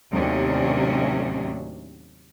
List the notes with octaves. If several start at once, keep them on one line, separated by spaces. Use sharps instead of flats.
D#2 A2 C3 F#3 C#4 D4